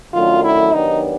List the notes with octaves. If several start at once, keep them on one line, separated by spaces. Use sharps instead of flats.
F#2 D#3 F#3 A3 D4 F4
E4
D#3 F#3 B3 D4 D#4 G4